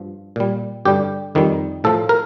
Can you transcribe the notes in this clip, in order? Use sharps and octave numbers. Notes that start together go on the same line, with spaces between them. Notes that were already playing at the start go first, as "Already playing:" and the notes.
Already playing: G2 F3
A#2 G3
G2 D3 G3 G4
F2 D#3 G3
A2 F3 A4
A#4